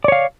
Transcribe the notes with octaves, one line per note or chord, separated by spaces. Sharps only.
C#5 D5 F5